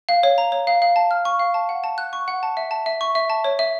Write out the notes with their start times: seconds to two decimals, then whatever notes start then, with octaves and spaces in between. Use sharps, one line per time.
0.09 F5
0.23 C#5
0.38 A#5
0.52 C#5
0.67 F5
0.82 F5
0.96 A5
1.11 F6
1.25 C#6
1.39 F5
1.54 A5
1.69 F#5
1.84 A5
1.98 F#6
2.13 C#6
2.28 F#5
2.43 A5
2.57 E5
2.71 A5
2.86 E5
3.01 C#6
3.15 E5
3.30 A5
3.44 C#5
3.59 E5